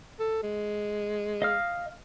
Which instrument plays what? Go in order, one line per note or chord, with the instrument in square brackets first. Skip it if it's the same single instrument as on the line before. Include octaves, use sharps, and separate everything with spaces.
[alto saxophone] A4
G#3
[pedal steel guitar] D#5 F5 F6